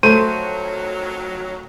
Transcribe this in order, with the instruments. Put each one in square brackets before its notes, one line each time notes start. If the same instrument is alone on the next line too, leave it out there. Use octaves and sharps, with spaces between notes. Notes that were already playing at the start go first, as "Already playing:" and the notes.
[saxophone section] F2 D#3 F#3 [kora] A3 [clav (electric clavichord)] C5 [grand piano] D#7